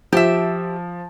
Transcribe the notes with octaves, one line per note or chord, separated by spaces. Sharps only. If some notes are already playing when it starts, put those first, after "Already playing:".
F3 G4 E5